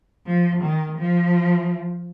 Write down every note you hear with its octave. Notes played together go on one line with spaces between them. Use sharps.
F3
D#3
F3